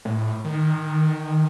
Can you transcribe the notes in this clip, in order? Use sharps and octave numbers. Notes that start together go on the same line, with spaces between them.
A2
D#3